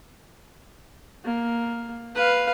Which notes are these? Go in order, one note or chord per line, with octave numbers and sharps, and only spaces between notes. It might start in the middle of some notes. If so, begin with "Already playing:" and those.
A#3
B4 F5